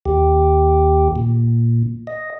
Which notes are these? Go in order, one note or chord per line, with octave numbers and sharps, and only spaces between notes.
D#2 G4
A#2
D#5